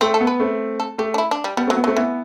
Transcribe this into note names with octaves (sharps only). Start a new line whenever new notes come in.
A3 C4
A4
B3
B4
A3 C4
A4
A3 G4
D4
E4
D4
G3
G3 B3
F#3 A3 C4
B3
F#3 A3 C4
E3 B3